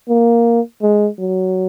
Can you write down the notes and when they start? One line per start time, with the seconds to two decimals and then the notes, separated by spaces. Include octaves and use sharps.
0.09 A#3
0.82 G#3
1.19 F#3